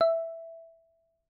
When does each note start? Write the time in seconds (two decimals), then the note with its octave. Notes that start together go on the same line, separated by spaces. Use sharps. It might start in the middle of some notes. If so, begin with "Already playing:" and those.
0.01 E5